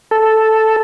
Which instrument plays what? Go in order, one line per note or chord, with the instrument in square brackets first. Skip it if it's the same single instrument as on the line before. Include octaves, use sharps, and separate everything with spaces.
[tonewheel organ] A4